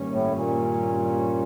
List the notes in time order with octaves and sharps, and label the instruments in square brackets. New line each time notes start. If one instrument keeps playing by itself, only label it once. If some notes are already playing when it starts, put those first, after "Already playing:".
Already playing: [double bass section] G2 D#3 G3 A#3 C#4
[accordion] A2
A#2